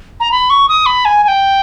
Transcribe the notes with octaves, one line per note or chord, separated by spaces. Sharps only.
A#5
B5
C#6
D#6
B5
G#5
G#5
G5